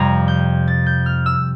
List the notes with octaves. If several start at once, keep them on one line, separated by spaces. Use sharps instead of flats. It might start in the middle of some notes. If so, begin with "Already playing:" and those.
Already playing: F2 C3 G3 A#5
G6
A6
G6
F6
E6